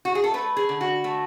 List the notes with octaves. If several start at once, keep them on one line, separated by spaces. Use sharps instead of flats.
F#4
G#4
A4
A3 B4
G#4
D3
F#4
A3